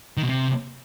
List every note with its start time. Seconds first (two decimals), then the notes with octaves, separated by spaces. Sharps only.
0.17 D#3
0.23 B2
0.29 C3